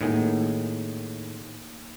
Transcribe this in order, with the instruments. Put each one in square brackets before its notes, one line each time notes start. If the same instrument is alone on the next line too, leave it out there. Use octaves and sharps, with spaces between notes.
[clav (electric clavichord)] A2 D#3 G#4 [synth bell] A#3 D#4